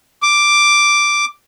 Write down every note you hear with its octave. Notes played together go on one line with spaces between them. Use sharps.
D6